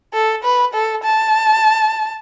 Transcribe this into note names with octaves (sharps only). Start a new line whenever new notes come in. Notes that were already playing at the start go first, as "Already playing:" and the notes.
A4
B4
A4
A5